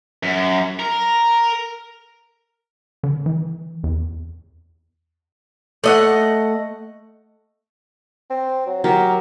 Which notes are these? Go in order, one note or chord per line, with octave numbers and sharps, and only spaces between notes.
F#2
A#4
D3
E3
E2
A3 D#5 F#5
C4
F#3
F#3 G4 A#4